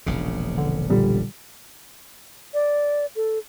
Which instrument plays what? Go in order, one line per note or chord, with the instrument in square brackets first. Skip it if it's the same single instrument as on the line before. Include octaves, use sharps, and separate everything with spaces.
[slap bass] E1 A#1 C#3
[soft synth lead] D3
[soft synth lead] A#2 [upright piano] D3 G3
[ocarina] D5
A4